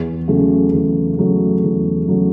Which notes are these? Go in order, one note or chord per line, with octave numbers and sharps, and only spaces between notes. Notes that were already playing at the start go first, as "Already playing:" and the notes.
Already playing: E2
C#3 F#3 A3
E2
C#3 F#3 A3
E2
C#3 F#3 A3